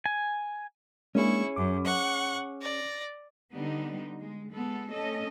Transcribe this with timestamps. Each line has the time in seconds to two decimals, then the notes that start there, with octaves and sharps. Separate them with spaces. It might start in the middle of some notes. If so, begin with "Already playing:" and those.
0.06 G#5
1.15 G#3 A#3 C#4 D4 E4 G#4 C#6
1.56 F#2 D6
1.86 F#5 C#6 F#6
2.60 D5 A#6
3.54 D3 G3 B3 D#4
4.19 G#3
4.52 G#3 B3 A4
4.92 A3 C#4 A4 D#5